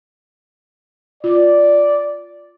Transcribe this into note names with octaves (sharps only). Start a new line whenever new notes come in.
F4 D5